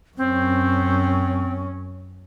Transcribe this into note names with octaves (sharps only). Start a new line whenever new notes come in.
F#2 C4 C#4